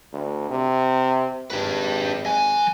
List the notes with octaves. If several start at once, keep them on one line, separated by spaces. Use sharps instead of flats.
D2
C3
G#1 G4 B4
F#3 G#5